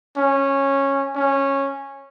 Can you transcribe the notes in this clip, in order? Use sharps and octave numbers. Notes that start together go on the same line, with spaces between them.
C#4
C#4